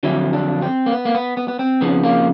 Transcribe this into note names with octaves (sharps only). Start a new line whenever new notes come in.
F2 D3 F#3 E4
D4
C4
A#3
B3
A#3
B3
B3
B3
C4
F2 C#3 F3 B3
A#3